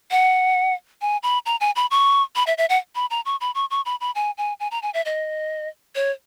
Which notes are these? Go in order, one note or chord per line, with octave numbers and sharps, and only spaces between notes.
F#5
G#5
B5
A#5
G#5
B5
C#6
B5
E5
E5
F#5
B5
A#5
C#6
B5
C#6
C#6
B5
B5
G#5
G#5
G#5
A#5
G#5
E5
D#5
C#5